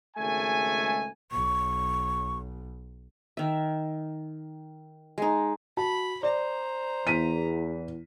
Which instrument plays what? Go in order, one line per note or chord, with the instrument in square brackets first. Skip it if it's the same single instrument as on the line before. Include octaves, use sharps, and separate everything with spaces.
[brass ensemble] G#1 C#2 A3 G#5
[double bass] B1 [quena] C#6
[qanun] D#3 E5
G#3 D#4
[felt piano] F#4 A5 [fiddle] B5
[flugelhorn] C5 [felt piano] D5 [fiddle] A#5
[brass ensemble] E2 [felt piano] B6 D#7